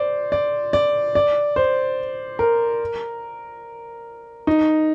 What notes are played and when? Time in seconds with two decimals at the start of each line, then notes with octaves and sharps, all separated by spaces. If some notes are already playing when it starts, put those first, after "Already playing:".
Already playing: C5 D5
0.32 D5
0.73 D5
1.15 D5
1.56 C5
2.39 A#4
4.47 D#4